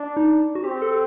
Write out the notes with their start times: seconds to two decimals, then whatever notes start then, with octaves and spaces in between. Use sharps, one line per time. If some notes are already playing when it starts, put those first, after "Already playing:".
Already playing: D4
0.17 D#4
0.55 F#4
0.64 C4 G4
0.82 A4